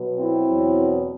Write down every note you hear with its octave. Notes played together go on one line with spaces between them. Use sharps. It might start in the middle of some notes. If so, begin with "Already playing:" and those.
Already playing: B2 F#3 B3
C4 E4
E2 B2 F#3